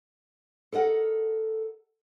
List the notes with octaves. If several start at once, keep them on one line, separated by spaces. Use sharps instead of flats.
A4 A#4 D#5 F#5